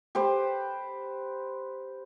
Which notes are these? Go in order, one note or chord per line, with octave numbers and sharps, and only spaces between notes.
G4 B4 C5